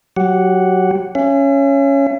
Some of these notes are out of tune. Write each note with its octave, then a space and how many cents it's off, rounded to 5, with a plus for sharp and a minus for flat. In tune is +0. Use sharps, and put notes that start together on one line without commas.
F#3 +0 G4 -15 F#5 +0
C#4 +0 E5 +45